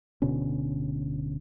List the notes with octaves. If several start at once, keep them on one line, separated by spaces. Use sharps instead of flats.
D1 B2 D3 C#4